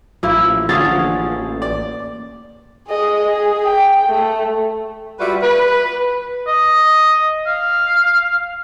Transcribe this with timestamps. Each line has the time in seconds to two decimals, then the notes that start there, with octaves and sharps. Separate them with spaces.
0.23 A1 F3 A#3 E4
0.69 D3 F3 C#4 G#4 F5 A6
1.62 D5
2.88 G#4 D#5
3.27 G#4
3.63 G5
4.07 A3
5.20 G3 F4 F#4 B4 D5 E5
5.42 B4
6.47 D#5
7.46 F5